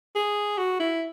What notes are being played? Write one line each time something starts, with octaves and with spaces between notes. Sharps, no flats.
G#4
F#4
E4